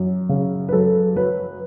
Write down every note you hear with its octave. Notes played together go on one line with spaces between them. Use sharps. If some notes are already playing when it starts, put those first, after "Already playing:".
Already playing: F#2
C#3
B4
F#2 A4
F#3 B4